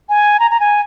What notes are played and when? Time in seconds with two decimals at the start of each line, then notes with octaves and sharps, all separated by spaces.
0.09 G#5
0.40 A#5
0.51 A#5
0.60 G#5